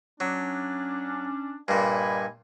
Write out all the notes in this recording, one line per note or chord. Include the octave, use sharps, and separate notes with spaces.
F#3 C#4 D4
G2 A#2 D#5 G#5 B5